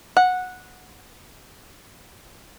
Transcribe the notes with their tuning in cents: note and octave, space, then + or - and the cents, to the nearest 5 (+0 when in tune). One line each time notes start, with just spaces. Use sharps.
F#5 -10